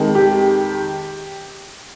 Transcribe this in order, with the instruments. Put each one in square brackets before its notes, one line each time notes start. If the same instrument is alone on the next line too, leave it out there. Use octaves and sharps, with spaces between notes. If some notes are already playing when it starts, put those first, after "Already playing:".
Already playing: [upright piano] F2 D#3 G#3
G4